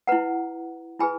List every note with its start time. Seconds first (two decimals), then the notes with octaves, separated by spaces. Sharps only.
0.07 E4 B4 F#5 A#5
1.00 E4 G#4 B4 G#5 B5